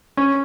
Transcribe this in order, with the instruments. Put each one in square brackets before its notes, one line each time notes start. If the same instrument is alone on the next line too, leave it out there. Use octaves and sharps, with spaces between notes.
[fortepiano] C#4